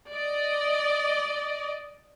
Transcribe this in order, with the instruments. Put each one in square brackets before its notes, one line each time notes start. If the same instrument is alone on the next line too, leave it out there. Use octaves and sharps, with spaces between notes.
[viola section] D5 D#5